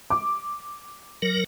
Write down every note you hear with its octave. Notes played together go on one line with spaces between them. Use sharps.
D6
F#3 A#4